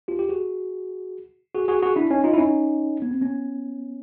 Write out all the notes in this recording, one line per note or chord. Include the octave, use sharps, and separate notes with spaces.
F4 G4
G4
F#4 G#4
F#4 G#4
F#4 G#4
F#4 G#4
D4 E4
C#4 D#4
D#4 F4
E4
C#4 D#4
B3
C4
B3 C#4